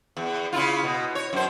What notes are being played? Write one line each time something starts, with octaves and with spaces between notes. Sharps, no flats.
E2
C#3 E4 F4
B2
C#5
F#2 C5